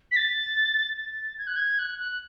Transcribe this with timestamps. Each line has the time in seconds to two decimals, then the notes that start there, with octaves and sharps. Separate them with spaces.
0.11 B6
0.16 A6
0.97 A6
1.38 G#6
1.47 F#6
1.56 G#6
1.78 F#6
1.99 F#6